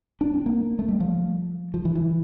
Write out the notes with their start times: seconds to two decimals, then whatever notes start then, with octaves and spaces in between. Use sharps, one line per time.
0.21 D4
0.34 C4
0.46 A#3
0.79 A3
0.89 G3
1.00 F3
1.74 F3
1.85 E3
1.95 E3